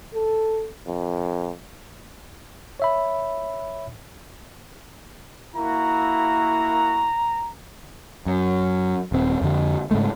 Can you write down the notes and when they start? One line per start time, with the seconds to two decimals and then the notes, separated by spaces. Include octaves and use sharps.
0.14 A4
0.86 F2
2.80 C#5 E5 B5
5.55 A#3 E4 F#4 A#5
8.26 F#2
9.12 D#1 C4
9.41 F2 D3
9.91 G#2 C#3 G#3 A3